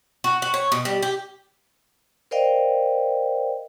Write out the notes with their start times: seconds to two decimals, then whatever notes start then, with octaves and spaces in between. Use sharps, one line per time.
0.24 F#4
0.42 F#4
0.54 C#5
0.72 B2
0.85 G3
1.02 G4
2.31 A#4 C5 D5 D#5 F5 G5